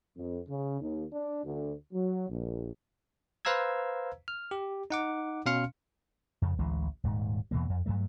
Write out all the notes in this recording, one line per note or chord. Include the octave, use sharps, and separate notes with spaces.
F2
C#3
D#2
D4
D2
F#3
A#1
B4 C5 F5 A#5 E6 G#6
F6
G4
D#4 F#5 D6
B2 C#4 F5 C6 F6 C#7
F2 C#3
A1 D2 E3 G#3
D#1 G#2
E2 B2 E3 A#3
F2
G2 F#3 A3